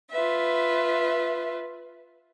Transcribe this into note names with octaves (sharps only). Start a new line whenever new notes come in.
F4 B4 E5